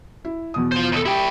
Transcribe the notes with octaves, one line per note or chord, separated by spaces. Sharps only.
E4
E2 B2 D#6
F4 C5
D#2 A4
E4 G4 G5